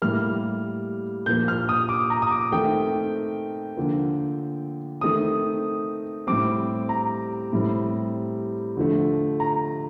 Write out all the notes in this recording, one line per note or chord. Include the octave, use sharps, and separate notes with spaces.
A2 G3 A#3 F6
A#2 F3 A#3 G6
F6
D#6
D6
A#5
D#6
D6
D#3 A3 C4 G5
D3 F3 A#3
D#3 A3 C4 D#6
A2 G3 C4 D6
A#5
A2 G3 C4
D3 F3 A3
A#5